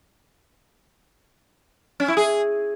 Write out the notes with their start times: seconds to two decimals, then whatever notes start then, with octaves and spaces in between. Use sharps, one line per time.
2.00 C#4
2.08 E4
2.17 G#4